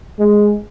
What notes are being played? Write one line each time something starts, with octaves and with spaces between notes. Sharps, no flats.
G#3